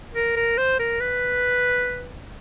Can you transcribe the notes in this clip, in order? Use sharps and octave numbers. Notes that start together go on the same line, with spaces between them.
A#4
A#4
C5
A#4
B4